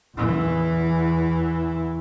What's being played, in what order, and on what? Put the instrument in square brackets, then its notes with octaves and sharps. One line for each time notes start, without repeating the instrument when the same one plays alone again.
[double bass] E2 E3